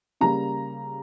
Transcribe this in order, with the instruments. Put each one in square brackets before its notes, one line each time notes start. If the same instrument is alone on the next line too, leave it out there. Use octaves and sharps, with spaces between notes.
[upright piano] C#3 G3 A#3 A#5